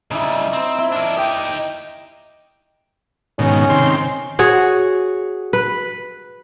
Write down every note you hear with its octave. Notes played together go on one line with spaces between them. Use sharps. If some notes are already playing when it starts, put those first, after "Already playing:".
C#3 G3 D#4 E4
C4
E4
D4 A#4
D#4 G4 D#5 G5
G#2 B2 D#3 C#4
C3 D#3 C6
F#4 G#4 C#5
B4